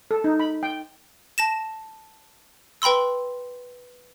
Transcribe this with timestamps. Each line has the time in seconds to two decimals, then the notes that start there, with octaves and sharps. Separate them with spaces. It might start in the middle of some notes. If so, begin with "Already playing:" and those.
0.11 A4
0.24 D#4
0.40 B5
0.63 G5
1.38 A5 A#6 E7
2.82 B4 G5 B5 C6 E6